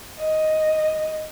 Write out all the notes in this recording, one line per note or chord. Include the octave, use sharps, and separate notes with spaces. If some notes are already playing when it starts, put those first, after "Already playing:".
D#5